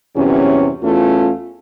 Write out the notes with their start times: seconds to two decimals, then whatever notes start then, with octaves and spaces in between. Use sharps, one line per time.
0.16 E2 G2 C3 F#3 C#4
0.83 E2 A3 C#4 F4